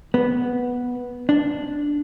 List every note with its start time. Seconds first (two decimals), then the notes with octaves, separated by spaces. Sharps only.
0.14 B3
1.29 D4